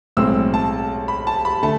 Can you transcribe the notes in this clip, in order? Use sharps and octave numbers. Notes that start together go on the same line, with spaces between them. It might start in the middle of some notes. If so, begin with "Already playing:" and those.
B1 A2 G#3 C4 E6
A5
B5
A5
B5
D3 A3 A5